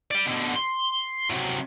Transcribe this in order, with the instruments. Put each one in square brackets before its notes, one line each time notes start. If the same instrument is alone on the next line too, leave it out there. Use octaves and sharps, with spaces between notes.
[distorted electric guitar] D5 G5
B2 D3
C6
C3 F#3